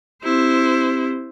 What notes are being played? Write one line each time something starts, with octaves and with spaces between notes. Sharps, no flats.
C4 E4 G4 C5